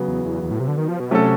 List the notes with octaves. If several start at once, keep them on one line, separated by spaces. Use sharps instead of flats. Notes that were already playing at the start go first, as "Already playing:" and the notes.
Already playing: C#3 F#3 B3
E2
E2
E2
A2
C3
D3
D#3
F3
B2
C3 F#3 A3 C#4 F#4 A4